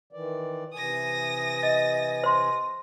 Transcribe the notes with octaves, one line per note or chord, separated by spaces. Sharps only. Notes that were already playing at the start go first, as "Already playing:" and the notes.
D#3 E3 D5
C3 E3 G#5 D#6 A#6
D#5 A6
C5 C6